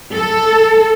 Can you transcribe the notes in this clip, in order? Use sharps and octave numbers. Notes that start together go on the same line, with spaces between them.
A4